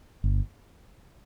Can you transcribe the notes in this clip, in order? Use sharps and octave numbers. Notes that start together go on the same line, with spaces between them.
G1